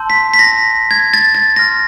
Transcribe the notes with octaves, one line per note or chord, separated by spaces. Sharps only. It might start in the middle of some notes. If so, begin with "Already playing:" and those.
Already playing: A5 C6 E6 G6
B6
B6
A#6
G#6
A6
A6
C6 F6 A#6